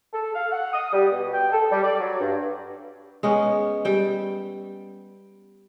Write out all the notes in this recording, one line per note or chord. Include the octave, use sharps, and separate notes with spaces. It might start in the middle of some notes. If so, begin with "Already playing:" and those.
A4
F5
F#5
D#6
G3
B2
G5
A4
G3
D5
F#3
G2
G#3 B3 C#4
G3 G5